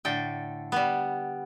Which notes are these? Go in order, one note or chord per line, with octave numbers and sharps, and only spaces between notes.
A2 D3 A4 G5
G3 B3